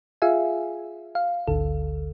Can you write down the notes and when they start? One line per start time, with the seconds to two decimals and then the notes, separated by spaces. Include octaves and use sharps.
0.22 F4 G#4 E5 F5 G#5
1.15 F5
1.48 G#1 D2 D3 A4